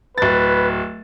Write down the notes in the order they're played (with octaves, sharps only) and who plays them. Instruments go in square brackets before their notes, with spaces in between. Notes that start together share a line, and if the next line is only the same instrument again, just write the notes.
[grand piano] D1 A6 [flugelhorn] B4